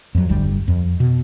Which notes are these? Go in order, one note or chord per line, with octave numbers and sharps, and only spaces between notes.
F2 F#3
D1 G1 D2 G3
F2
B2